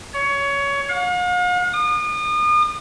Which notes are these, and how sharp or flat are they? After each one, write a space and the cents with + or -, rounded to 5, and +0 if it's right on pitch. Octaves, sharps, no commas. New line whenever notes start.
C#5 +20
F5 +45
D#6 -40